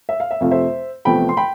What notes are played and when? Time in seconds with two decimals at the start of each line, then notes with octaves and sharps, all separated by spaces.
0.09 E5
0.20 F5
0.31 E5
0.40 F2 C3 F3 A3 F5
0.51 C5 E5
1.05 E2 C3 F3 A3 G5 B5
1.29 C6
1.37 G5 B5